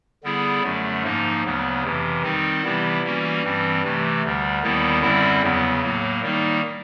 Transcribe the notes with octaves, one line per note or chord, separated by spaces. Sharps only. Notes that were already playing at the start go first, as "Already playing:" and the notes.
D3 G3 B3 E4 G#4
F#2 D3 F#3 A3
G#2 F3 A#3 D#4
D2 C#3 F#3 B3
F2 C3 E3
D#3 G3 C4 D#4
C3 E3 G3 B3 E4
E3 G3 A#3 C#4 F#4
G2 E3 G3 C4
C3 E3 A3
D2 D3 G3
D#2 D#3 G3 B3 E4
F#2 D3 G3 C4 E4
E2 C#3 F#3 B3
A2 F#3 A#3
D#3 G3 A#3 D#4